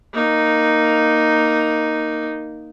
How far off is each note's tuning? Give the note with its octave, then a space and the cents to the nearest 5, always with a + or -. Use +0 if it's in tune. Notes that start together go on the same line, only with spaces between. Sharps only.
A#3 +0 D#4 +0